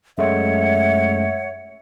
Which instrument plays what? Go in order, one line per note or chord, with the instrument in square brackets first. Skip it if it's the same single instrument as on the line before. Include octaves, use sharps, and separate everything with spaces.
[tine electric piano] F#2 G#3 A3 [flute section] C#5 F#5 [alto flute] E5